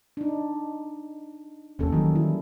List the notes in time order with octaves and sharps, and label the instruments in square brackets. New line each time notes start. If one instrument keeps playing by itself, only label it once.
[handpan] D4 D#4
[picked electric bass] E1 D#2 [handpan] A#3 C#4 A4
[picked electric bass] D#3 [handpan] E3 F#3 G3
[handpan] E4